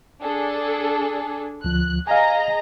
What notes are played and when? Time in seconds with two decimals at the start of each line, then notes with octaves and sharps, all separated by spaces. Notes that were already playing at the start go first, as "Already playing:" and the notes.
0.22 D4 G#4 A4
1.65 D2 F3 F#6
2.07 G#4 D#5 F5 G#5 A#5